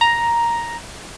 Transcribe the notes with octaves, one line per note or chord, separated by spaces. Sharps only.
A#5